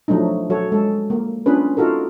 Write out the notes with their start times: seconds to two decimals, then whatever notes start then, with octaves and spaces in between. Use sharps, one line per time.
0.08 F3 F#3 A3 D4 D#4
0.50 F#3 F#4 A4 C#5
0.72 G#3 A4
1.10 A#3
1.46 B3 C#4 D4 F4 G#4 B4
1.77 D#4 F4 F#4 A4 A#4